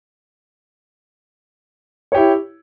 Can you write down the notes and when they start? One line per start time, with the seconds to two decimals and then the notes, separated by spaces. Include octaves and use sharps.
2.12 C#5
2.14 G4
2.17 E4